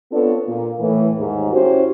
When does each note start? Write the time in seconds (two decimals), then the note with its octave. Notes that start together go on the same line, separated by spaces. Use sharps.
0.12 B3 C4 D4 F4 A4 C#5
0.46 A#2
0.80 A2 E3
1.18 D#2 G#2
1.52 C#4 E4 F#4 G4 C5